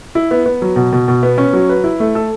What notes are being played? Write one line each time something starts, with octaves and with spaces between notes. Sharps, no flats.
E4
B3
B3
F#3
B2
B2
B2
B3
C#4
F#3
B4
E4
A3
A4